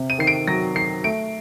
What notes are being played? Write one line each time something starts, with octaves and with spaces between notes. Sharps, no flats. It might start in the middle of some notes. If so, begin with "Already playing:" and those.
Already playing: C3
D#7
D#3 C7
D7
F#3 A#6
D#3 C7
A3 D7